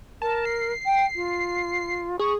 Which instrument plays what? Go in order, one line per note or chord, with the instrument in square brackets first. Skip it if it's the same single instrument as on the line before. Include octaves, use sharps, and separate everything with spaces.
[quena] A#4 [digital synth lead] A5
[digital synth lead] C7
[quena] G5
F4
[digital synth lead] G#4 [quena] C#6